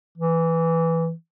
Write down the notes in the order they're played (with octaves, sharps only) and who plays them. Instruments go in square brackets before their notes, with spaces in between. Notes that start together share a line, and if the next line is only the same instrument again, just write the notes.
[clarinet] E3